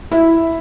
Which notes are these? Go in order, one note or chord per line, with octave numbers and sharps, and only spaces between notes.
E4